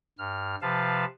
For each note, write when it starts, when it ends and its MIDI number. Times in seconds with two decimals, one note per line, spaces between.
0.18 0.55 43
0.18 0.55 89
0.62 1.05 48
0.62 1.05 53
0.62 1.05 71
0.62 1.05 77
0.62 1.05 81